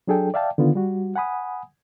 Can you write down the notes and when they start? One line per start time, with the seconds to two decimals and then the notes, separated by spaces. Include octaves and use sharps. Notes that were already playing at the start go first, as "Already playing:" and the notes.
0.07 F#3 D4 G#4 A4 G5
0.34 D5 E5 F5 G5 A5
0.58 D3 D#3 B3 F4
0.75 G3 F#4
1.16 F#5 G#5 B5 D#6